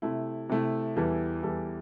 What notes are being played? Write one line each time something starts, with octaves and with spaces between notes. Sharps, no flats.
C3 A3 E4
C3 A3 E4
E2 E3 G3 E4 A4
E2 E3 G3 E4 A4